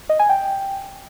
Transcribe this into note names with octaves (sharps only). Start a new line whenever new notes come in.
D#5
G#5
G5